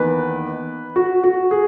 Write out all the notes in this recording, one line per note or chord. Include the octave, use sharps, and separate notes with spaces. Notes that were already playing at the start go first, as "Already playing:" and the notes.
Already playing: E2 D#3 A#3 D#4 B4
F#4
F#4
G#4